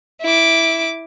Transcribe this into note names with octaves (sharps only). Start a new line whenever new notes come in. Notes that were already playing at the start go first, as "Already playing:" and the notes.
E4 D6